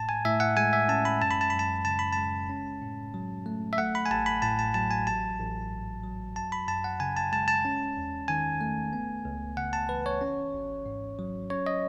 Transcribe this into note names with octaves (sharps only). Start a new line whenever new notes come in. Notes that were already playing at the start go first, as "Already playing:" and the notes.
Already playing: A2 A5
G#5
A2 E5
F#5
G#3 G#5
E5
C#4 A5
B5
F#2 A5
B5
A5
F#2 B5
A5
C#3 A5
B5
G#3 A5
C#4
A2
F#3
A3
E5
A3 F#5
B5
G#5
A1 A5
B5
A2 A5
A5
F#3 A5
G#5
A1 A5
A1
G#2
F#3
F#2 A5
B5
F#2 A5
F#5
C#3 G#5
A5
G#3 A5
A5
C#4
E2
D#3 G#5
A3
B3
C#2
C#3 F#5
A5
E3 B4
C#5
C#4
G#1
G#2
F#3
C#4 C#5
D#5